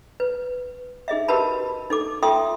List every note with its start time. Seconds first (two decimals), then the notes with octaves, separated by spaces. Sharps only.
0.20 B4
1.08 D#4 G#4 D#5 E5
1.28 F#4 G4 A#4 B4 A5 B5
1.90 D#4 A4 D6
2.23 F4 A4 E5 G5 C6 D#6